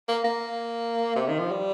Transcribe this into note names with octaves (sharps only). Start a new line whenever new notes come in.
A#3
A#3
C3
D#3
F3
G3